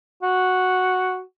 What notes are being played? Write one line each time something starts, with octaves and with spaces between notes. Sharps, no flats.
F#4